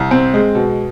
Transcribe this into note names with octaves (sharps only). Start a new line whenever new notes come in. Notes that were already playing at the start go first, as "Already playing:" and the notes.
Already playing: C2
C4
G#3
B2